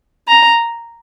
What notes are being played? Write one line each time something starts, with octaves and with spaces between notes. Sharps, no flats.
A#5